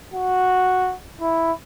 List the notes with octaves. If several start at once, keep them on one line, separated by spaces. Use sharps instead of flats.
F#4
E4